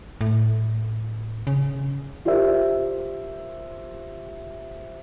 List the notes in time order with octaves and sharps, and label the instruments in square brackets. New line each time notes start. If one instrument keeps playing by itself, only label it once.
[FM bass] A2
C#3
[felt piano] F4 G4 A#4 C5 E5